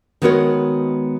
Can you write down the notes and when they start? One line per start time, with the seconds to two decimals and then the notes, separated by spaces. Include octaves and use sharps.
0.22 D#3 G#3 B3 F#4 A#4 C#5